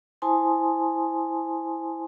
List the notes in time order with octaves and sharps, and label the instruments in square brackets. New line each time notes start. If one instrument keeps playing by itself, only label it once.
[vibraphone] E4 C5 G#5 A5 C6 D#6